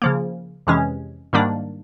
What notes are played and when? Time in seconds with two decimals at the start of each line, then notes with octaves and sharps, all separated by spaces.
0.02 C#3 F3 A#3
0.67 F2 C3 E3 G#3 C#4
1.33 G#2 D#3 G3 A#3 D4